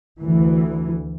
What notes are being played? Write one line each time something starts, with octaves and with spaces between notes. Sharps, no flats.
D2 E3